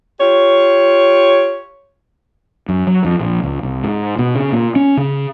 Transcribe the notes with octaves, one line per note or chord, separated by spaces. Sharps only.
F4 G4 C#5
F#2
F#3
F2
A#1
C#2
C2
G#2
B2
C#3
A#2
C#4
C#3